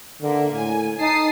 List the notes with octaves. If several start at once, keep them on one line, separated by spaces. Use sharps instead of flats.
D3 A#3 E5
A2 G#5
D#4 A5 D#6 C7